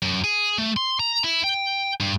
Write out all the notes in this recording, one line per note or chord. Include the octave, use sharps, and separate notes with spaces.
F#2
G#4
A3
C6
A#5
E4
G5
G2